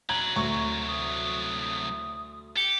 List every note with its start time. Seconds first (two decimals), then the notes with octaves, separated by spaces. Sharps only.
0.09 C2 F#3 A#5 G#6 F#7
0.36 D2 A#5 C#6
0.88 D#6
2.57 G4 C#7